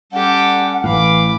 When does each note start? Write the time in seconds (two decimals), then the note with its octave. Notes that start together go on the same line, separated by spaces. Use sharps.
0.13 G3 C#4 G4 A4 F#5
0.84 A1 A2 E3 F5 B5 D6